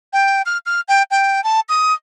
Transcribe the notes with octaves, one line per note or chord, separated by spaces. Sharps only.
G5
F6
F6
G5
G5
A5
D#6